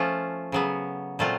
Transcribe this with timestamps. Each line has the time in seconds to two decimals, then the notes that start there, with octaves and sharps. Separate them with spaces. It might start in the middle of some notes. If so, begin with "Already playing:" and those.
Already playing: F3 A3 C#4 F4
0.52 C#3 F#3 B3
1.19 A#2 F#3 A3 C4 F4